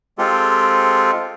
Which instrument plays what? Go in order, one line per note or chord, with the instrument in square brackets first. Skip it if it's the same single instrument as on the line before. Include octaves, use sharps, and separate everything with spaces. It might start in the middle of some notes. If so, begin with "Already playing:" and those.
[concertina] G#3 C4 F4 G4 A4